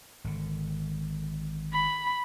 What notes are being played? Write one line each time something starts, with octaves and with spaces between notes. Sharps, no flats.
G#1 D3
B5